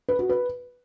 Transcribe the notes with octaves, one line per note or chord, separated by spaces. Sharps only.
B4
F#4
B4